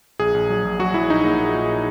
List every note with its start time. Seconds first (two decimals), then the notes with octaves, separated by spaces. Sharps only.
0.20 A#1 G#4
0.34 A#1
0.50 F#3
0.65 A#1
0.79 F#3 F#4
0.94 F#3 E4
1.10 A#1 D#4
1.25 A#2
1.40 A#2
1.54 A#2